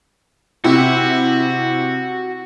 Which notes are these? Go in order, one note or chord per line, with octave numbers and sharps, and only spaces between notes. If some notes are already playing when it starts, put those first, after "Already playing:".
C3 E4 F#4